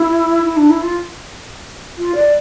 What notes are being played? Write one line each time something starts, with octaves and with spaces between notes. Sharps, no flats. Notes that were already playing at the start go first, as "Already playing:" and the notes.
Already playing: E4
E4
D4
E4
F4
F4
D5